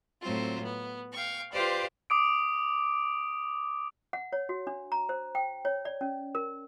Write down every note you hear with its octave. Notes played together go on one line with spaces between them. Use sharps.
A2 F#3 C4 F4
B3
F5 G5 C#6
F4 G4 B4 C5 D5 F5
D6 D#6 D7
F#5
C#5
F#4
D4
A#5
C5
G5
C#5
D5
C#4
A#4